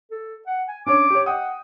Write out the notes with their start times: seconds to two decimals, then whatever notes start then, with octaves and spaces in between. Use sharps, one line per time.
0.11 A4
0.47 F#5
0.68 G#5
0.86 C#4 D4 C#5 D6
1.10 G4 C#5
1.26 D#5 F#5 G5 D#6